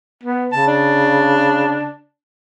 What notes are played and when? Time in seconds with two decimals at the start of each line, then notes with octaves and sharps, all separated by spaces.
0.23 B3
0.52 C#3 A5
0.67 D4